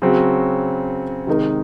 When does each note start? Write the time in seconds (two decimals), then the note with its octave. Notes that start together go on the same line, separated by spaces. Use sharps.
0.02 C#3 F#3 C4 F#4
1.27 C3 D#3 G#3 D#4 A#4